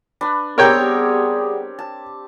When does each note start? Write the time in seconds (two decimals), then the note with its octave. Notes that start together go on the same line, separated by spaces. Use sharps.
0.21 D4 B4
0.58 G3 B3 C4 G4 G#4 A#4 C#5 G5
1.79 A5